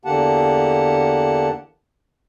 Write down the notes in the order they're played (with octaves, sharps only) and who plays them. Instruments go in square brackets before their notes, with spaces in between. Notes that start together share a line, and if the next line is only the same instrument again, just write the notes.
[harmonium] E2 D3 A#3 G4 F#5 A5